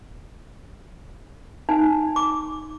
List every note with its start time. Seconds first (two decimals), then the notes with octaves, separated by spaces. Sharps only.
1.69 D#4 G#5
2.16 D6